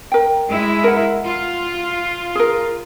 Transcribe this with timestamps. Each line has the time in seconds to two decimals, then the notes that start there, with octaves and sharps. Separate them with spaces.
0.12 A#4 G5
0.49 G#3 E4
0.84 A#4 F#5
1.26 F4
2.35 G#4 A#4